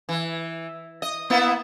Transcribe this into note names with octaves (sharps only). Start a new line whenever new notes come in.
E3
D#5
A#3 B3 E4